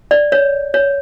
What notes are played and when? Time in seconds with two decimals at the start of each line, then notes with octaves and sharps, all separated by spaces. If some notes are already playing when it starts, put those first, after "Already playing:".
0.11 D5
0.32 C#5
0.74 C#5